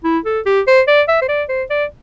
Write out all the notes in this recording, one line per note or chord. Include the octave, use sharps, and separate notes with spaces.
E4
A4
G4
C5
D5
E5
C5
D5
C5
D5